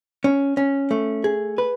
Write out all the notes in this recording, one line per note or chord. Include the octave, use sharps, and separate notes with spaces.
C#4
C#4
A3
G#4
B4